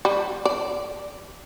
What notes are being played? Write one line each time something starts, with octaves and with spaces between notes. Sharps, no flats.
G3
D5